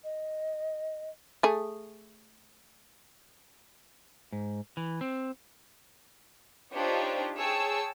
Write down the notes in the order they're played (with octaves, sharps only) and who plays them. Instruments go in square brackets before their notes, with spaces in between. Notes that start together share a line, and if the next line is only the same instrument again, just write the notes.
[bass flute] D#5
[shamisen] A3 G#4
[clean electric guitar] G#2
E3
C4
[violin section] D4 D#4 F4 G4 C5 C#5
G#4 C#5 G5 A5 E6